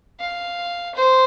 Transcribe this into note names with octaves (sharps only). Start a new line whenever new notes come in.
F5
C5